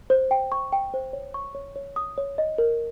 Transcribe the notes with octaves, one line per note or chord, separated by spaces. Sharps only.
C5
G5
C#6
G5
C5
C#5
C#6
C#5
C#5
D#6
C#5
D#5
A#4